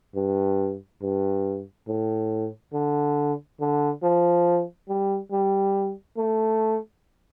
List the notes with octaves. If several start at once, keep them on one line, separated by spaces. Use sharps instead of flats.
G2
G2
A2
D3
D3
F3
G3
G3
A3